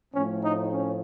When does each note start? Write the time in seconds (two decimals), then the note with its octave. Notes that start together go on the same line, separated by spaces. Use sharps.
0.12 A2 F3 A3 C4 C#4
0.42 D#4
0.70 C#4